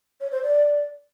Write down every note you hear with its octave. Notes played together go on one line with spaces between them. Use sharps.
C#5
C5
D5